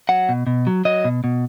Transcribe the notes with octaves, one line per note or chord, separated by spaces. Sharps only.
F#3 F#5
B2
B2
F#3
F#3 D#5
B2
B2